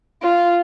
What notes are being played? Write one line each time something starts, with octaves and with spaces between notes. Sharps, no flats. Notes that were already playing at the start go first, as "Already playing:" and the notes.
F4